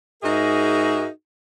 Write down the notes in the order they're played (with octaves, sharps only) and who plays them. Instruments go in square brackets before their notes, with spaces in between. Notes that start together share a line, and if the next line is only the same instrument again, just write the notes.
[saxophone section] G#2 D#4 F#4 G#4 A#4 E5